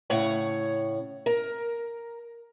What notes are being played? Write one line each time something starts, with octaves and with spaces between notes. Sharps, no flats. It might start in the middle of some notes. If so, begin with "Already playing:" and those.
A2 C#3 C#5 F#5
A#4